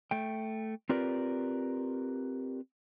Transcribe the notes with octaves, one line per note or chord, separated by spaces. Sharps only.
A3 G5
C4 F4 G4 A#4 B4 D5